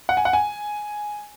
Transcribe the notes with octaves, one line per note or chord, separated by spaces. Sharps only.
F#5
G#5
F#5
G#5